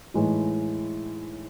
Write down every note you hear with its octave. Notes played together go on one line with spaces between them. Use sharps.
A2 E3 G#3 D#4